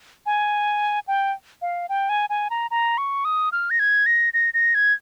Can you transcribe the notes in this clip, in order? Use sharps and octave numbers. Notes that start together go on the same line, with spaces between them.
G#5
G5
F5
G5
G#5
G#5
A#5
A#5
C#6
D#6
F6
A#6
G#6
A#6
A#6
A#6
G#6